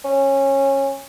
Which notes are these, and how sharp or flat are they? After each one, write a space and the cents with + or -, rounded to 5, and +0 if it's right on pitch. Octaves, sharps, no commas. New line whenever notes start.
C#4 -20